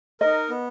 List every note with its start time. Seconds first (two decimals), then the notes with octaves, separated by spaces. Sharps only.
0.21 D#4 A#4 D#5
0.50 B3